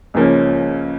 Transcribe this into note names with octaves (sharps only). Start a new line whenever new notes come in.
C#2 C#3 F3 A#3 C#4